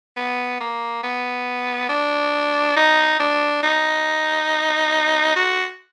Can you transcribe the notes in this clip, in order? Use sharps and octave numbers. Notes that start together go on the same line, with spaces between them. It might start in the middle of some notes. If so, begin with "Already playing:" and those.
B3
A#3
B3
D4
D#4
D4
D#4
F#4